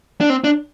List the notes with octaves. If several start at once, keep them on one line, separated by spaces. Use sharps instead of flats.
D4
C4
D4